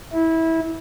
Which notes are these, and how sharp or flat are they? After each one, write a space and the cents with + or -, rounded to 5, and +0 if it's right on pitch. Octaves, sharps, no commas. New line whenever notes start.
E4 -20